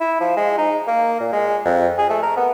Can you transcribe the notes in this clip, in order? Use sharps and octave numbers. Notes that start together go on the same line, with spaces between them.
E4
F3
G#3
D#4
A#3
A#2
G#3
F2
G#4
A3
A#4
B3